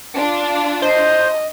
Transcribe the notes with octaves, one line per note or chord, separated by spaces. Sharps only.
D4 F4
C5 D#5